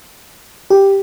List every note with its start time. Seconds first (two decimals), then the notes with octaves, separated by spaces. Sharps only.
0.70 G4